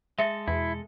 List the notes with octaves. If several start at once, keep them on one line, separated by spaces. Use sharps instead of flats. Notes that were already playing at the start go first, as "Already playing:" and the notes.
G#3 A4 E5
E2 B2 E4